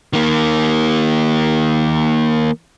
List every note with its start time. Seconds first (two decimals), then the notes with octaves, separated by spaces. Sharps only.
0.13 D#3 A#3